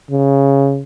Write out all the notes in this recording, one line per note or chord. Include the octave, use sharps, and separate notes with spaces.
C#3